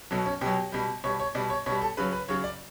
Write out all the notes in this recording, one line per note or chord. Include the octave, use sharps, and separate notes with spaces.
B2 F#3 A4
C#4
B2 F#3 G4
B2 G3
B2 G3 C#5
C#5
B2 G3 D5
C#5
B2 G3 C#5
A4
C#3 F#3 B4
B4
C#3 F#3 C#5
D5